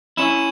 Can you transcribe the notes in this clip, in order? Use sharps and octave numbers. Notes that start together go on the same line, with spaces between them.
C#4 E4 E7